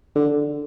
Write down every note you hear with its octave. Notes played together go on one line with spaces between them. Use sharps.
D3